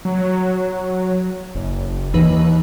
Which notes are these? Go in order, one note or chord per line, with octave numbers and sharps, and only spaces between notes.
F#3
F#1
D#2 E3 D#4 B4